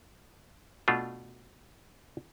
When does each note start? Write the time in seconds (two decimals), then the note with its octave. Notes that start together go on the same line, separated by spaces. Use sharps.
0.88 B2 A3 D4 F4